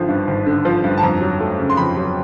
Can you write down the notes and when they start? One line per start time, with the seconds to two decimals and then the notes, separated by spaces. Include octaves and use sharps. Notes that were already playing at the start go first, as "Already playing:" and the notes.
Already playing: G#1 D3 F3
0.09 G2
0.27 G#1
0.47 D3
0.65 F3
0.84 G2
0.98 A5
1.03 F2 A#5
1.21 F#3
1.40 A3
1.59 C#3
1.70 C6
1.77 F2 B5
1.97 F#3